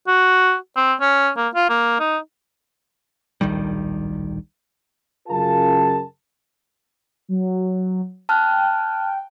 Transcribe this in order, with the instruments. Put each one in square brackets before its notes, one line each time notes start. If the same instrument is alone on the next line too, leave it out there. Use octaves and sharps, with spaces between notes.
[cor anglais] F#4
C4
C#4
A#3
F4
A#3
D#4
[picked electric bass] D1 A#1 D#3 G3
[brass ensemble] F#2 C#3 F4 G#4 A#4 A5
[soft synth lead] F#3
[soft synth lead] G5 [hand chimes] A5 F6 F#6